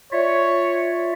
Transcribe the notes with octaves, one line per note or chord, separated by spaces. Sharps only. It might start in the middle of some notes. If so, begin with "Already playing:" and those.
F4 C#5 D5 E5